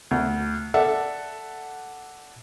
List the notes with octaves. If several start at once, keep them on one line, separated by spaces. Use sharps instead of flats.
D2
A4 D5 E5 F#5